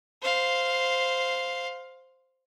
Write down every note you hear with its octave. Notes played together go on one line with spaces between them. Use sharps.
C5 F5